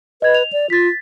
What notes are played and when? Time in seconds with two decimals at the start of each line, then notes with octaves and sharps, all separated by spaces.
0.22 B4 D#5 G#6
0.35 F7
0.53 D5
0.70 F4 A6 B6